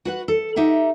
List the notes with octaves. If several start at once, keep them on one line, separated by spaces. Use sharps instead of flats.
F#4 B4 F#5
A4
D#4 G4 E5 F#5